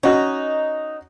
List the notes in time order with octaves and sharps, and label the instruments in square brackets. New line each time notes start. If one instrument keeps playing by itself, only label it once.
[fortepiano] C#4 F#4 [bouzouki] D#4